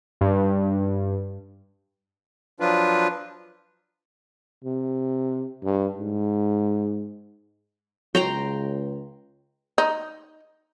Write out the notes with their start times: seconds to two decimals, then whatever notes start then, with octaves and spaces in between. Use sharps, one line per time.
0.21 G2
2.60 F3 F#3 D4 F4 B4
4.64 C3
5.63 G2
5.98 G#2
8.15 C#2 F#3 G5 A#5 C6
9.78 D#4